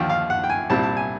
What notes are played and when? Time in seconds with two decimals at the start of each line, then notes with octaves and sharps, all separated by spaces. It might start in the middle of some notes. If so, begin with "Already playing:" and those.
Already playing: D#2 D3 F3 G5
0.09 F5
0.30 F#5
0.44 G5
0.50 G#5
0.70 C2 A#2 G3 C4 E4 A5
0.83 A5
0.97 G#5